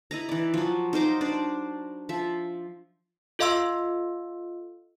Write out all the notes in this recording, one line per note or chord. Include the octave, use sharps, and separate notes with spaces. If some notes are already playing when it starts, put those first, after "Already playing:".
E4 D#5 A#5
E3 D5
F3 F#3
D#4 A#4 C5 D6
D4 C5 D5
F3 E5
F4 A4 D#5 F5 C6 E6